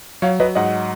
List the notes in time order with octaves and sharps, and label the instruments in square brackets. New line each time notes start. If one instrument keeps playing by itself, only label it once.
[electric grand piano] F#3 [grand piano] C#5 F5
[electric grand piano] F#3 [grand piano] B4 D#5
[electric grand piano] G#2 [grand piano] D#5 F#5